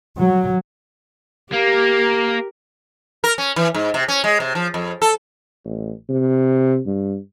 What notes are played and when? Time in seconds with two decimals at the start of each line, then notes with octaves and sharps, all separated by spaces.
0.18 F#3
1.52 A#3 G4 A#4
3.24 A#4
3.38 C#4
3.56 E3
3.74 G#2
3.94 C3
4.08 C#4
4.24 G#3
4.40 C3
4.55 F3
4.74 F2
5.02 A4
5.65 A1
6.09 C3
6.86 G2